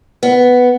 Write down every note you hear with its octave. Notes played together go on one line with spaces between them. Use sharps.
B3